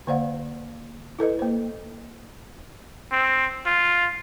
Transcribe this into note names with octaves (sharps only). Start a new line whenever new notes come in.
D3 A#3 C5 D5 F5 F#5
E4 A4 B4 D#5
A#3 C5
C4
F4